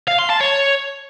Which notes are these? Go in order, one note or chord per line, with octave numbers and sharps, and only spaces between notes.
F5
C6
A5
C#5